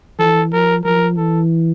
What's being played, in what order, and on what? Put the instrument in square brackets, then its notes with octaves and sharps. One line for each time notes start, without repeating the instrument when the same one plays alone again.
[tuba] E3 [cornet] A4
[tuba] F3 [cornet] A#4
[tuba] F3 [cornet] A#4
[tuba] E3 [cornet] A4